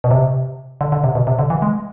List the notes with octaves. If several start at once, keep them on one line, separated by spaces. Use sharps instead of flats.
B2
C3
D3
D3
C3
B2
C3
D3
E3
G#3